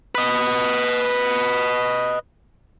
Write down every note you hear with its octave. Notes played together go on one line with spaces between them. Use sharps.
B4 D#5